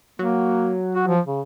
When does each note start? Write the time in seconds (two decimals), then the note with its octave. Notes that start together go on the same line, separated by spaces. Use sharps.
0.19 F#3 A#3
0.95 F#4
1.07 F3
1.26 C#3